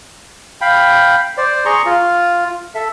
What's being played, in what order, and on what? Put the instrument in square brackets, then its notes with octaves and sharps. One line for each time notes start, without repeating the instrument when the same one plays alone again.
[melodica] F5 G5 B5
C5 D5
G#4 A#5 C6 C#6
F4
A4 E5